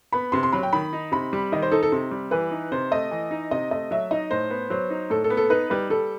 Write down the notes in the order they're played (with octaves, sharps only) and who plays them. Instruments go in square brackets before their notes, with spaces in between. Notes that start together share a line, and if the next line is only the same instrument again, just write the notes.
[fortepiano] B3 [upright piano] B5
[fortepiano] C3 [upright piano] C6
[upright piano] C6
[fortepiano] F#3 [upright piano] B5
[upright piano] G5
[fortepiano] D#3 [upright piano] B5
[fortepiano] D#4
[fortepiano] C3 [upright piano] B5
[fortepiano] G3
[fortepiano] D#3 [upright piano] D#5
[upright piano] C5
[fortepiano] D#4 [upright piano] A4
[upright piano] A4
[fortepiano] C3
G3
[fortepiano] E3 [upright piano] B4
[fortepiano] D#4
[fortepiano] C3 [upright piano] C5
[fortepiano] A3 [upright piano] D#5
[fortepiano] E3
D#4
[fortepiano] C3 [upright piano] D#5
[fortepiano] A3 [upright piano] D#5
[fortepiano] F#3 [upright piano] E5
[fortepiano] D#4 [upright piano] D#5
[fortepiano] A2 [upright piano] C5
[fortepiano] B3
[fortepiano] F#3 [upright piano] C5
[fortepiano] D#4
[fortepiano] A2 [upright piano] A4
[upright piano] A4
[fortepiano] B3
[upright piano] A4
[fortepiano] D#4 [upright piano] B4
[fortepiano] G3 [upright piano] B4
[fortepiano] G3 [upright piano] A4